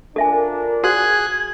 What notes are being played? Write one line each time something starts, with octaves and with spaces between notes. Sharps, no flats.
D4 F4 A4 A#4 E5 G#5
F#4 G#4 C5 F#5 F#6 G#6